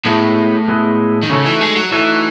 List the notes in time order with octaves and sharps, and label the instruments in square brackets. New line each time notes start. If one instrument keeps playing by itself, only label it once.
[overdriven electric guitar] A2 [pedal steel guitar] G#3 B3 E4 G#4
[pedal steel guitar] G#3 B3 E4 G#4
[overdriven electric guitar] D#3
[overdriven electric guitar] C#3 [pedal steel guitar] A3 D#4 F#4 A4 C#5
[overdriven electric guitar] E3
G#3
F#3
[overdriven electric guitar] E3 [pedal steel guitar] A3 D#4 F#4 A4 C#5